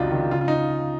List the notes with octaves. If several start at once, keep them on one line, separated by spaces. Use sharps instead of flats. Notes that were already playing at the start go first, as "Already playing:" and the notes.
Already playing: C#2 C3 F#3 D4 D#4 F4
D#3
C#3 F4
F4
D#4